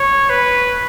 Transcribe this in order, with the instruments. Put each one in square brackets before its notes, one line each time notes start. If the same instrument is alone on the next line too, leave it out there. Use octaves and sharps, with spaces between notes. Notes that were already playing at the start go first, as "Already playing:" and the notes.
Already playing: [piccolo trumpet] C#5
B4